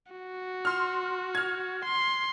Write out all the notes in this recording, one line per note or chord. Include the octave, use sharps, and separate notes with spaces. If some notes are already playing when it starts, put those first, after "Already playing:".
F#4
C6 F6
F6 G#6
C6